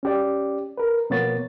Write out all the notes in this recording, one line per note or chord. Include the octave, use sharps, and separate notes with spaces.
C#4 G4 D5
A#4 B4
B2 F3 A#3 B3 C#5 A6